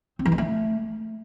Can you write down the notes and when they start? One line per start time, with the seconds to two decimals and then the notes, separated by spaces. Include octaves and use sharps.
0.19 C4
0.26 E3
0.32 G#3
0.38 A3